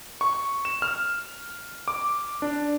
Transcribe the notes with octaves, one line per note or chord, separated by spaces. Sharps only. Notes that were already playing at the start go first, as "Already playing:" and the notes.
C#6
E7
F6
D6
D4